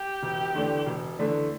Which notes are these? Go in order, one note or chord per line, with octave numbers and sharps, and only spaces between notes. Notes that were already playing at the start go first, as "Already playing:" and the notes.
Already playing: G4
E1
E2 D3 A3 D4
E1
E2 D3 A3 D4